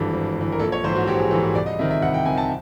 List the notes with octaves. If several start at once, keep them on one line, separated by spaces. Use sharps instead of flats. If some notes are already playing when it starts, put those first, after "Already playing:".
Already playing: G#1 G2 E3 A4
G#1
G2 E3
A#4
A#1 A4
C#5
G#2 E3 C5
F#4
A#1 G4
G#4
G#2 E3 A4
G#4
C2 D5
D#5
C3 D#3 E5
E5
C2 F#5
G5
C3 D#3 G#5
A5